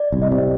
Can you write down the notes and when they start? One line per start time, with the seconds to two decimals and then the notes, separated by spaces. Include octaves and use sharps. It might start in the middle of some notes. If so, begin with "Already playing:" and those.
Already playing: D5
0.12 C2
0.22 D#5
0.32 C3